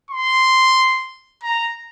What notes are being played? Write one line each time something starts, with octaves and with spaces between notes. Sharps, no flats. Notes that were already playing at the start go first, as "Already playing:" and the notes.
C6
A#5